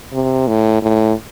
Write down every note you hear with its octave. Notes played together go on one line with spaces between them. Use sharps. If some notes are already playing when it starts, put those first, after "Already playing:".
C3
A2
A2